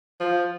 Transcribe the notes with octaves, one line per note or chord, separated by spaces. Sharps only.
F3